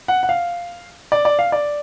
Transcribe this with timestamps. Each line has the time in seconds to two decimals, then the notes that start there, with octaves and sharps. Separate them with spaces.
0.08 F#5
0.23 F#5
0.29 F5
1.12 D5
1.25 D5
1.39 F5
1.52 D5